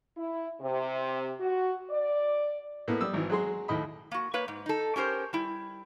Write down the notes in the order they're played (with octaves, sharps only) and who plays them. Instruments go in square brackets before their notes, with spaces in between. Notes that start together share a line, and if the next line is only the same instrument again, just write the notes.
[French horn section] E4
C3
F#4
D5
[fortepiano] A2 A#3 B3
G3 D#6 E6
G#1 E3
F#3 G#3 G#4 C6
D#2 A2 D#5 B5
[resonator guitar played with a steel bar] A#3 F#4
A#3 B4 C#5
G#2
D#4 A4
C#4 G4 A#4 C5
G3 E4